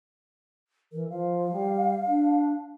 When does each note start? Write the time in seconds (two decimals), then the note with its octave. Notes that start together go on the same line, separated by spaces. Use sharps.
0.93 E3 A#4
1.09 F3 F5
1.52 G3
2.07 D4